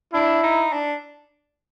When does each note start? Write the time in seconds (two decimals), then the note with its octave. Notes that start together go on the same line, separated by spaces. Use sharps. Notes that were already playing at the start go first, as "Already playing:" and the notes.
0.13 D4 E4
0.43 D#4
0.73 D4